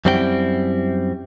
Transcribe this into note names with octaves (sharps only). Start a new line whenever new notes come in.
F#2 G3 C4 E4 A4 G5